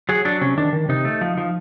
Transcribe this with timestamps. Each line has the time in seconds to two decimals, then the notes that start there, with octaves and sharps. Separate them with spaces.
0.09 F#3 G#4
0.25 F#3 D4
0.41 C3 C#4
0.57 D#3 D4
0.73 D#3
0.89 C3 D#4
1.05 A3
1.21 F3
1.38 F3